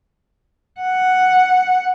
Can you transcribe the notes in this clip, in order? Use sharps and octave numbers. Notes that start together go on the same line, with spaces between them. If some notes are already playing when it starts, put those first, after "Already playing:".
F#5